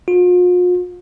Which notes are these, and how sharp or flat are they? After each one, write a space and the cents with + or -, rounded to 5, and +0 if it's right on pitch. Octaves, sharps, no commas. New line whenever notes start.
F4 +45